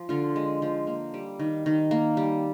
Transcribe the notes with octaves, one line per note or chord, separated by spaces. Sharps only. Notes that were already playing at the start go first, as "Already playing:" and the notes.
Already playing: F3
D3 F4
G#3
F3
A#3
G3
D#3
D#3
A#3
G3